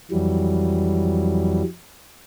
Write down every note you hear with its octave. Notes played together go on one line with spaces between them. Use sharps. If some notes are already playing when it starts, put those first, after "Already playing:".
F2 E3 F#3 G3